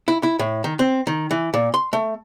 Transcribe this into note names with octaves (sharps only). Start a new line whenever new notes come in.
E4
E4
A2
D#3
C4
D#3
E3
A#2
C6
A3